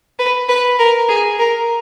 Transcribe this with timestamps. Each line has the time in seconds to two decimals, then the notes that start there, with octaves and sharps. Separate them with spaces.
0.19 B4
0.49 B4
0.79 A#4
1.09 G#4
1.39 A#4